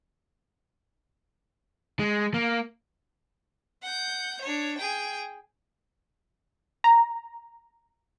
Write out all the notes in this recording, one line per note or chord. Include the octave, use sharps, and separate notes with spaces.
G#3
A#3
F#5 G6
D4 C#5
G#4 G5
A#5